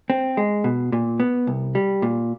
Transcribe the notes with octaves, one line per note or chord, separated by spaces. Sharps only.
C4
G#3
B2
A#2
B3
C2
G3
A#2